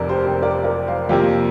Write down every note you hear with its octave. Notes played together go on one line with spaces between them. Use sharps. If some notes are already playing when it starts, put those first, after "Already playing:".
Already playing: F1 F2 C3 A#4 D5
G4 C5
G4 C5
A#4 D5
A#4 D5
C5 F5
F2 C3 F3 A#3 D5 G5